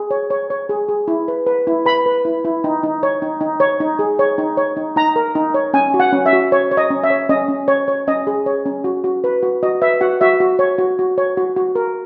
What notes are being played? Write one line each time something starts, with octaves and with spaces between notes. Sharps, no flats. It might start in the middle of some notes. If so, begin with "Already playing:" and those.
Already playing: G#4
C#5
C#5
C#5
G#4
G#4
E4
B4
B4
E4
B4 B5
B4
E4
E4
D#4
D#4
C#5
D#4
D#4
C#5
D#4
G#4
C#5
D#4
C#5
D#4
D#4 A#5
A#4
D#4
C#5
C#4 G#5
F#4
F#5
C#4
E5
F#4
C#5
C#5
D#5
C#4
E5
C#5
C#4 D#5
C#4
C#5
C#5
C#4 D#5
G#4
C#5
C#4
F#4
F#4
B4
F#4
F#4 D#5
B4 E5
F#4 F#5
F#4 E5
F#4
C#5
F#4
F#4
C#5
F#4
F#4
A#4